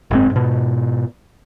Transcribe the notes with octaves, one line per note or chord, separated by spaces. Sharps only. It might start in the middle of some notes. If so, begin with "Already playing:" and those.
F#1 G#2 C4
G#2 B2